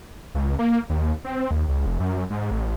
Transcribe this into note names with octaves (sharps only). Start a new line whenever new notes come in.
C#2
A#3
D#2
C4
D#2
C#2
F1
F#2
G#2
A1